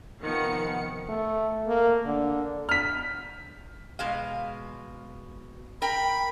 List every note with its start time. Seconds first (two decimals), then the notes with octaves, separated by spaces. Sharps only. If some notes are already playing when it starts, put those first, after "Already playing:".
0.22 C3 D#3 F3 B3 F#5 C#7
1.09 A3
1.68 A#3
2.06 D3
2.69 F6 B6
3.99 B2 G#3 F5
5.82 A#4 G5 B5